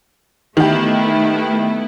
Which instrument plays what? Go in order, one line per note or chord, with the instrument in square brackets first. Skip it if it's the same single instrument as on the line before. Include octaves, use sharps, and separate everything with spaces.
[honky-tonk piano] D#3 G4 [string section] A3 B3 E4